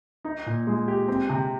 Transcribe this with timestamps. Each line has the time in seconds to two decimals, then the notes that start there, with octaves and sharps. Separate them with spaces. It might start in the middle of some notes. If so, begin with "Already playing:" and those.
0.25 D#4
0.46 A#2
0.67 G#3
0.88 G4
1.08 C4
1.29 C3